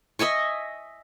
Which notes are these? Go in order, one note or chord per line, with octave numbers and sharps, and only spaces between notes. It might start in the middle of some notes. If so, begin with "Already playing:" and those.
D#5 E5 G#5 C#6